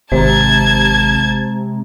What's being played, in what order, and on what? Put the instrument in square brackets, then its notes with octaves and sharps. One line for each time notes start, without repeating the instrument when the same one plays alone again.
[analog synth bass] G#1 [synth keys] C3 [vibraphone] G#3 A#5 [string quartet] A5 G#6